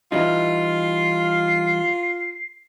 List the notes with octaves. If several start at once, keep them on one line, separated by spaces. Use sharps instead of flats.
E3 G3 D#4 F4
C7